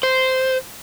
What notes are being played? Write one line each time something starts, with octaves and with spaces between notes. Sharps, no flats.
C5